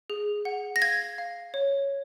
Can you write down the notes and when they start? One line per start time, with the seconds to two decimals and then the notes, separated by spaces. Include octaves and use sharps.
0.10 G#4
0.45 F#5
0.76 A#6
0.82 F5 G#6
1.18 F5
1.54 C#5